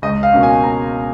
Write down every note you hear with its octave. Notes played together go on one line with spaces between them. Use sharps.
C#2 D#5
F5
B2 A#3 C#4
G#5
A#5